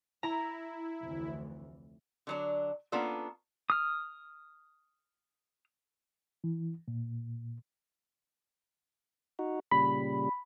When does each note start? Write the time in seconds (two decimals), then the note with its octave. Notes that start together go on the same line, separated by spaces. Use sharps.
0.23 E4 A#5
1.02 F1 D2 E3
2.27 D3 F#3 D4
2.92 A#3 B3 C#4 D4 F4 A4
3.70 D#6 F6
6.44 E3
6.88 A#2
9.39 D#4 F#4
9.71 A#2 C#3 G3 B5